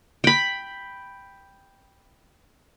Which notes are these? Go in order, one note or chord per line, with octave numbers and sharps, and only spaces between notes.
G5 B5